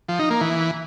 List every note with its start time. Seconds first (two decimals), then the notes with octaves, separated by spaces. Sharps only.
0.09 F3
0.19 D#4
0.30 A#3
0.41 E3